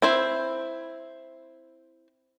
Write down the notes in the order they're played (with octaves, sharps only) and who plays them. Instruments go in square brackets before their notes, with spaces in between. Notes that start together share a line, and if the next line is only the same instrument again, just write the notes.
[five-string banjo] C4 E4 C5